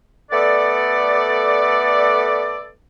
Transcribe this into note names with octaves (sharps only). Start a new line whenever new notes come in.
A3 B3 A4 D5